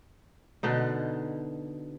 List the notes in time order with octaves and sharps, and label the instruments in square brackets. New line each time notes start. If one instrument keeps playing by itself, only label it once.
[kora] B2 D3 D#4